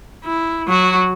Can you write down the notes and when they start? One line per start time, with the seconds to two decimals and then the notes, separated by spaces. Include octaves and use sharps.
0.24 E4
0.68 F#3 F#4